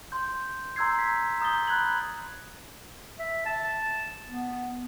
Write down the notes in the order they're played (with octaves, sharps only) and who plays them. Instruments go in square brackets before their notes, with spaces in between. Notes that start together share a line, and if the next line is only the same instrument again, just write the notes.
[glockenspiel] C6 G6
A#5 C6 E6 G6 G#6 C7
B6
A#5 D#6 G6 A6 G7
B5 F#6 G#6 F#7
[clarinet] E5
A5
B3